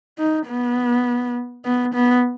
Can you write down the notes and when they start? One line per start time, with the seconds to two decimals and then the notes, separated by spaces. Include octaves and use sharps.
0.18 D#4
0.48 B3
1.65 B3
1.94 B3